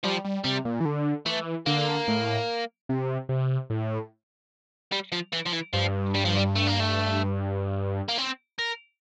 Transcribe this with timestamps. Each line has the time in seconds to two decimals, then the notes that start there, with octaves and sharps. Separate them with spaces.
0.03 F3 G3
0.24 G3
0.44 C3 G3
0.65 A#2
0.80 E3
0.85 D3
1.26 E3 A3
1.66 D3 A#3
2.08 A2
2.89 C3
3.29 C3
3.70 A2
4.92 G3
5.12 F3
5.33 E3
5.46 F3
5.53 E3
5.73 G2 F3
6.15 G3
6.25 F3
6.37 G3
6.56 A3
6.67 A#3
6.80 A3
8.08 A#3
8.18 C4
8.59 A#4